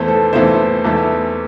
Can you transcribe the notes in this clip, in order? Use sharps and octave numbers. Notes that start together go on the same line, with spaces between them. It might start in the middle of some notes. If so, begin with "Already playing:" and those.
Already playing: E2 E3 A3 C5
A4
E2 E3 A3 C5
E2 E3 A3